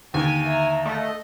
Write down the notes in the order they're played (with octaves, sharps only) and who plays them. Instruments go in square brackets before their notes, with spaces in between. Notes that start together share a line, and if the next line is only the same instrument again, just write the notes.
[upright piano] D#2 [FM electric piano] D3 [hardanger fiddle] G4 [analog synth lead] G#5
[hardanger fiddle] E5 A#5
[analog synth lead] A3 [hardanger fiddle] D#5